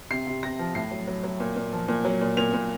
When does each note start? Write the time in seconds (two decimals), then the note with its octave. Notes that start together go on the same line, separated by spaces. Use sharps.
0.10 C3 C7
0.27 C3
0.43 C3 A#6
0.59 F3
0.75 A2 C7
0.91 F#3
1.07 F#3
1.24 F#3
1.40 A#2
1.56 A#2
1.73 F3
1.88 A#2
2.05 F#3
2.21 A#2
2.37 A#2 F7
2.53 A#2